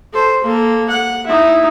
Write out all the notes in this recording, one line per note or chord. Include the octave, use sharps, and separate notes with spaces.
A4 C5
A#3 A4
F#5
D#4 E4